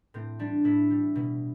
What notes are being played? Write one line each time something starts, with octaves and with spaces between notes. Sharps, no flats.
A2 C4
G3 D4
A2 E4
G3
B2